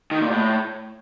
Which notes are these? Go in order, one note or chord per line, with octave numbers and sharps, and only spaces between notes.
D#3
A#2
A2